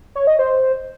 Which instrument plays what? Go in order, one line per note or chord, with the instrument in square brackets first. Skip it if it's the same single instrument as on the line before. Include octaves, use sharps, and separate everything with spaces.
[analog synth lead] C#5
D#5
C5